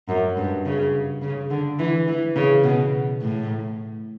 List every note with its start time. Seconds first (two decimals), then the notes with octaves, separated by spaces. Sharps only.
0.09 F#2
0.37 G2
0.65 C#3
1.22 C#3
1.51 D3
1.79 E3
2.08 E3
2.36 C#3
2.64 B2
3.21 A2